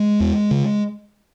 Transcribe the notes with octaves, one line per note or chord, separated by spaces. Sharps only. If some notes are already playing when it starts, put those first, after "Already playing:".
Already playing: G#3
E2
C#3